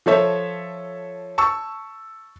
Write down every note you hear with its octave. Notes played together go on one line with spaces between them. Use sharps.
F3 A4 C#5 E5
A5 C#6 E6